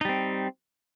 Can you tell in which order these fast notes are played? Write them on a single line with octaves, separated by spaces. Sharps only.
D#4 G3 C4